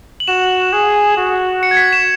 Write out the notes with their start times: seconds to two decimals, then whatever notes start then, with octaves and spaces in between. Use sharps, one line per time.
0.20 F#7
0.28 F#4 E7
0.73 G#4
1.17 F#4
1.63 C#7
1.71 G#6
1.77 B6
1.93 E7